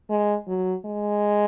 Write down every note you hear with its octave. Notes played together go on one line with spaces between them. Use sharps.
G#3
F#3
G#3